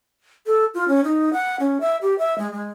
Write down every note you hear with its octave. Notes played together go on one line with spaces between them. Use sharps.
A4
F4
C#4
D#4
F#5
C#4
E5
G4
E5
G#3
G#3